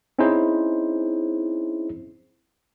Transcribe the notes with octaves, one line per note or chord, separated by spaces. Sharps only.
C4 C#4 D#4 E4 G#4 C5